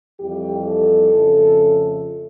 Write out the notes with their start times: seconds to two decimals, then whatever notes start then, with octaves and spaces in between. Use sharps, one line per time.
0.19 F2 E3 G3 G4
0.66 A4
1.12 F2 C#3 F3 A3